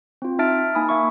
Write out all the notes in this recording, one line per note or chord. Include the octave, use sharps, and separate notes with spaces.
C4 F4
D#4 E5 A5 F6 A6 D7
A#3 D#4 G#5 B5 D#6
A#3 E5 C#6